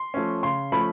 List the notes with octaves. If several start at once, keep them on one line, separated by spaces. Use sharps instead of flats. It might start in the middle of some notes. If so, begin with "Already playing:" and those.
Already playing: C6
F3 A3 C#4
C#3 C6
F3 A3 C#4 B5